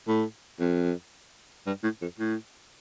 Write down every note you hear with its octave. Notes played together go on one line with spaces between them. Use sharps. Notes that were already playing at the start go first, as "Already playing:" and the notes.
A2
F2
G2
A2
F2
A2